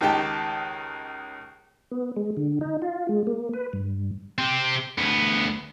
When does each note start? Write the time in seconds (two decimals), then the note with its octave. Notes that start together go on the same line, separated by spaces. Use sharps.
0.01 C#2 D#3 G4 G5 A5
1.91 B3
2.16 G#3
2.37 D3
2.61 D#4
2.82 F4
3.09 G#3
3.27 A#3
3.53 B4
3.73 G2
4.38 C4 G4
4.98 D2 B3